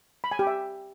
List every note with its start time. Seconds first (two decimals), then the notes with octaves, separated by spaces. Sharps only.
0.24 B5
0.32 G#5
0.39 G4
0.47 E5